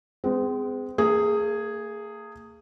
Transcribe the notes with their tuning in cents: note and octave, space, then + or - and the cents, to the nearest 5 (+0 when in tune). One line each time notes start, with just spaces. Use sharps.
G#3 +0 C4 -40
A#3 -45 G#4 +0